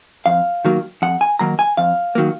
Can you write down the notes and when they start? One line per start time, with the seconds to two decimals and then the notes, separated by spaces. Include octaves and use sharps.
0.26 F2 F5
0.65 D#3 F#3 A#3
1.02 F2 F#5
1.21 G#5
1.39 D#3 F#3 A#3 A#5
1.59 G#5
1.77 F2 F5
2.15 D#3 F#3 A#3